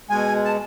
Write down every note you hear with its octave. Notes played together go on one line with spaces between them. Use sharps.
B2 G#3 G#5
A5